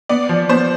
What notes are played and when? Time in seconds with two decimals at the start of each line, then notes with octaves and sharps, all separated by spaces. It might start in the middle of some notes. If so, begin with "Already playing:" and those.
0.09 B3 D5
0.29 F3
0.49 B3 C5